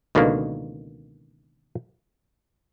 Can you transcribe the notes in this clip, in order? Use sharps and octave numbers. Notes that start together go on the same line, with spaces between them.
C#2 B2 D3 D#3 A#3